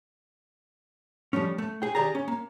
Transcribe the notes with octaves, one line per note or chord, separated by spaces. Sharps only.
F3 G3 A3 C#4
A3
G#4 G5
D#3 G4 G#4 D5 A#5
C#4
A#3